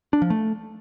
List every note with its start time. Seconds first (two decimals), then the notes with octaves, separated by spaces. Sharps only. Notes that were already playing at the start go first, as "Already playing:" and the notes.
0.13 D4
0.22 F3
0.30 A3